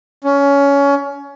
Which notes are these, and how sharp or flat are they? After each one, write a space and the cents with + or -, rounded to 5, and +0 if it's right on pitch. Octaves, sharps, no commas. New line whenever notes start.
C#4 +20